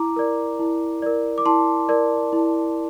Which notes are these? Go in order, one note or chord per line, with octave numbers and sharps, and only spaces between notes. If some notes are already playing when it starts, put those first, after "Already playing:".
Already playing: E4 A#5 D6
A#4 D5
E4
A#4 D5
D6
E4 A5 C6
A#4 D5
E4